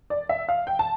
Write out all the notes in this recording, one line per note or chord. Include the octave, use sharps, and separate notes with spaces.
D5
E5
F5
G5
A5